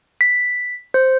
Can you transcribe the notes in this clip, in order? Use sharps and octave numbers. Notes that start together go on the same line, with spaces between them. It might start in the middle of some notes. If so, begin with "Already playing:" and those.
B6
C5